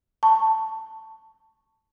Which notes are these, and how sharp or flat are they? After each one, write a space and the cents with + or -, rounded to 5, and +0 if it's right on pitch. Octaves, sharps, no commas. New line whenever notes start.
A5 +10 C#6 +0